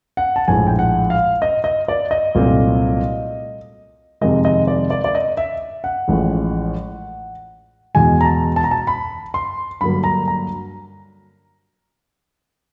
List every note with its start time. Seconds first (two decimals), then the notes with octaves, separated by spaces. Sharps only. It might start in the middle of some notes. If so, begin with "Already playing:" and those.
0.17 F#5
0.36 A5
0.48 A#1 A2 F3 G#3 G#5
0.67 G5
0.79 F#5
1.10 F5
1.42 D#5
1.64 D#5
1.88 D5
2.11 D#5
2.35 C2 A#2 F#3 A3 C4
4.21 F2 C3 D#3 G#3 D#5
4.45 D#5
4.67 D5
4.90 D5
5.04 D5
5.15 D#5
5.37 E5
5.84 F#5
6.08 A1 A2 F3 G#3
7.94 E2 B2 G#3 G#5
8.21 A#5
8.25 A5
8.56 A5
8.64 A#5
8.71 A5
8.87 B5
9.34 C6
9.81 G2 D3 F#3 A#3 B5
10.04 A#5
10.28 A#5